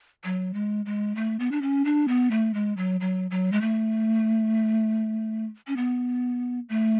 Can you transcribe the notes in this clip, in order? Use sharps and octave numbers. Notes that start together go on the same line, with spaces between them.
F#3
G#3
G#3
A3
B3
D4
C#4
D4
B3
A3
G#3
F#3
F#3
F#3
G#3
A3
C#4
B3
A3